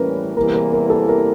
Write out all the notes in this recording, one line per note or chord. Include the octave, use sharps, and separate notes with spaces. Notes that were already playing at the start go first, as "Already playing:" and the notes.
Already playing: A2 E3 G3 A#3 C#4 A#4 B4
E2 C3 E3 G3 A#3 A#4
A#4
A#4
A4
A#4